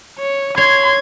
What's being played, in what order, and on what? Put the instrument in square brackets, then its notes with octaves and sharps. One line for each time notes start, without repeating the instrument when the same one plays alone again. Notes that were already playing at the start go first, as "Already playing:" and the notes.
[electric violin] C#5
[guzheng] C#5 [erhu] C6 [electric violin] G#6